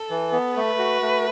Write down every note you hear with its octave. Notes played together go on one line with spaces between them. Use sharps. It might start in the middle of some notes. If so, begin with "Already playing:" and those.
Already playing: A4
E3
B3
A3 B4
F#4
A3